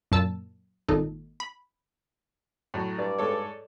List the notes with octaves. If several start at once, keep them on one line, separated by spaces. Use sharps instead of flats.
F#2 A#2 A5 E6
G#1 A#2 D#4 A4
B5
A2 F#3
G2 D5
G#2 A4 C#5